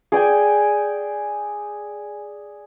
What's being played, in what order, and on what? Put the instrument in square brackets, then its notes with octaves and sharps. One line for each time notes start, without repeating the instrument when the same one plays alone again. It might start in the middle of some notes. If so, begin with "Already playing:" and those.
[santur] G#4 D5 G5 G#5